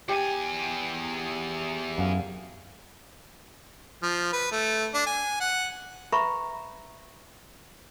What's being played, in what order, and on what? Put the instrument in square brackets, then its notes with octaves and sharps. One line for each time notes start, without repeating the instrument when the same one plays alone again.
[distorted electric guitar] E2 G#5 [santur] G4
[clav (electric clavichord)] F#2 F5
[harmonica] F3
B4
A3
D4
G#5
F#5
[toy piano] B4 E5 A#5 B5 C#6